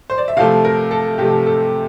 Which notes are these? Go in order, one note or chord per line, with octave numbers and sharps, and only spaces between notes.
C5
D5
E5
C3 F3 A3 F5
A#4
A4
C3 F3 A3 G4
A4